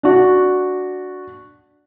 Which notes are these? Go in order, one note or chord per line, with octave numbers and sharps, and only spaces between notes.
D4 F#4